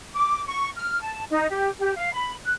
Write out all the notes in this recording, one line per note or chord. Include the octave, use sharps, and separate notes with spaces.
D6
C#6
F6
A5
D#4
G4
G4
F5
B5
F#6